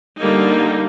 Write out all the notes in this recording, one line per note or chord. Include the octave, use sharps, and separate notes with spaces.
D3 G3 A#3 D#4